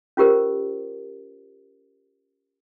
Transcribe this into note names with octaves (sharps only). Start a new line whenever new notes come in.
C#4 F4 G4 A#4 C5